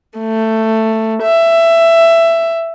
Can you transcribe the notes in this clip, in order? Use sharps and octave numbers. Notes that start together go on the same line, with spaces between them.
A3
E5